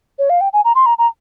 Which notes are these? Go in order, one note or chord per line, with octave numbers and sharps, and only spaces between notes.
C#5
F5
G5
G#5
A#5
C6
A#5
A#5